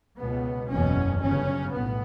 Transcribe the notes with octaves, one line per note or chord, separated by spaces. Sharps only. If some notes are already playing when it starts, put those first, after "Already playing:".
C#2 B2 B3
F#1 E2 B2 C#4
G1 F#2 C#3 C#4
B1 A2 B3